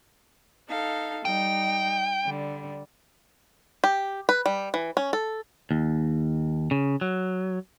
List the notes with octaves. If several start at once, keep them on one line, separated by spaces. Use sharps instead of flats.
D#4 A4 F5
G3 D#4 G5
D3 G3
G4
B4
G3
E3
C#4
A4
D#2
C#3
F#3